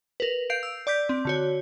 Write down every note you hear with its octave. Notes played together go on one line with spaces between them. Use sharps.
A#4 B4
F5 G6 C7 D7 F7
E6
D5 D6 G6 B6
C4
D3 F#4 C#5